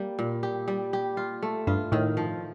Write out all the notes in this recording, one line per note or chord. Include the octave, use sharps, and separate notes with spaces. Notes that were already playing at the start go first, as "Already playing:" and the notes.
Already playing: G3 A#3
A#2
G4
G3
G4
F4
A3
G2 F4
A2 D#3
F3